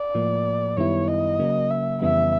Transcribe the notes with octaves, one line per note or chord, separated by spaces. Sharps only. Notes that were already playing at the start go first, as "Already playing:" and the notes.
Already playing: D5
A2 F3 A#3
F#2 D#3 G3 B3 E4 C#5
D#5
C#3 F#3 A#3
E5
F2 C#3 E3 G3 B3 E5